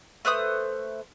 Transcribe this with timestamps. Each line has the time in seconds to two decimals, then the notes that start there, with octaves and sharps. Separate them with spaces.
0.25 A3 B4 C5 D#6